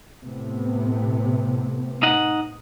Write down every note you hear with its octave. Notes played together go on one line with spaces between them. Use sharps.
A2 C3 B3
D#4 D#5 F#5